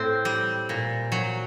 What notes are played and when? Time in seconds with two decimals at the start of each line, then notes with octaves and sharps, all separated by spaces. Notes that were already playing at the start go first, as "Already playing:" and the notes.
Already playing: A2 A3 C4
0.25 G3
0.69 A#2
1.12 F#3